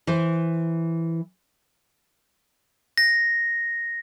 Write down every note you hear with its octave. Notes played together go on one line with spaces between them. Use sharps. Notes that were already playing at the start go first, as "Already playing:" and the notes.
E3 C5
A#6